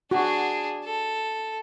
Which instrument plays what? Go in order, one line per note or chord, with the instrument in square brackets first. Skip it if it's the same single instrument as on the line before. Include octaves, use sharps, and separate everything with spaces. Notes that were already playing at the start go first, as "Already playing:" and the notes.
[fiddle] D4 G#4 [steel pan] F#4
[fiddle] A4